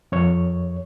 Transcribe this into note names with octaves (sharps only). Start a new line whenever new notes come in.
F2 C#5